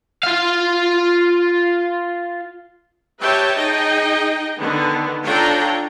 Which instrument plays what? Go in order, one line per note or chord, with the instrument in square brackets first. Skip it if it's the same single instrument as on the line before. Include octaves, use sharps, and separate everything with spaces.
[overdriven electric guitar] F4 F5
[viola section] G4 B4 C#5 E5 G5 A5
D#4 G#4 D#5 G5
D3 D#3 B3
D4 F4 A4 C#5 G5 A#5